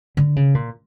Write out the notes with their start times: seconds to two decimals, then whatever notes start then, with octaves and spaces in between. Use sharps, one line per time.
0.17 D3
0.36 C#3
0.55 A#2